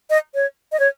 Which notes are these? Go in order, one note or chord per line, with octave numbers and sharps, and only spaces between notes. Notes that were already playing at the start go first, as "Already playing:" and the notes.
D#5
C#5
D#5
C#5